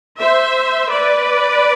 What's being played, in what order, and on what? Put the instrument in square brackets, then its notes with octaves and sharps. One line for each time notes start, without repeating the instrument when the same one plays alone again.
[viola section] C5 E5
B4 D5